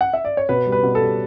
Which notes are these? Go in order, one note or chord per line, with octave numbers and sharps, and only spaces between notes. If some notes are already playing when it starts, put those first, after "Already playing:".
F#5
E5
D5
C#5
B2 B4
G3
B4
B2
A4
G3